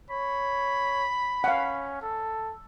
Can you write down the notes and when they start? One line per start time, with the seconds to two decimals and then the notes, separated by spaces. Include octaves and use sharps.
0.10 C#5 B5
1.44 C#4 F5 F#5
2.02 A4